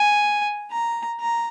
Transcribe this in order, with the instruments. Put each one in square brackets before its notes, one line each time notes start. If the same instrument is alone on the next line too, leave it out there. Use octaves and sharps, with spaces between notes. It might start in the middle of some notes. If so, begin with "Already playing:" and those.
Already playing: [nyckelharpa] G#5
A#5
A#5